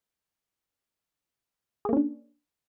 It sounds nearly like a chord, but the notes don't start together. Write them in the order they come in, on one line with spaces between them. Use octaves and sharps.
G#4 A#3 C#4 D4